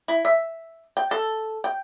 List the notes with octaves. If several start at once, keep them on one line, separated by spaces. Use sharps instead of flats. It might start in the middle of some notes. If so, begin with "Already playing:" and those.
E4
E5
G5
A4
G5